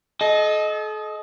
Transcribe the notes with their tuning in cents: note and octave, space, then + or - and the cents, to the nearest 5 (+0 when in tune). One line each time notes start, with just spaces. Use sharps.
A4 -40 D#5 +0